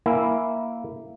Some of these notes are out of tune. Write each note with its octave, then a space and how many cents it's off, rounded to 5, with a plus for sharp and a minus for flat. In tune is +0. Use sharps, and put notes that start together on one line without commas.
A#3 +0 E4 +0 G#5 +0